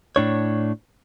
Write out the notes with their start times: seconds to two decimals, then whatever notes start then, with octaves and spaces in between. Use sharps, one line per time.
0.16 A2 D4 C#5